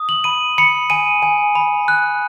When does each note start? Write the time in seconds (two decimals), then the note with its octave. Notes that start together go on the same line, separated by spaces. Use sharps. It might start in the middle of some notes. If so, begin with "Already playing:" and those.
Already playing: D#6
0.09 F#7
0.24 B5 D#7
0.58 B5 C#7
0.90 G#5 D#7
1.23 G#5
1.55 B5
1.88 F#6